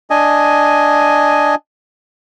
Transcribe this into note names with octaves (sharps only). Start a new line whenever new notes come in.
D4 D#5 G#5